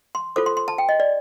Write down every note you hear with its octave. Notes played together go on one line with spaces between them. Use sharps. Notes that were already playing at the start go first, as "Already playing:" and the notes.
C6
F4 A4 C5 D6
C6
C6
A5
G5
D#5
D5